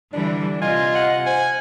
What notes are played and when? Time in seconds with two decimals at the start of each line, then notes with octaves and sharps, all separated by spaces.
0.13 D3 E3 G3 D4
0.62 C3 F4 D#5 G#5
0.95 F#5
1.26 C5 G#5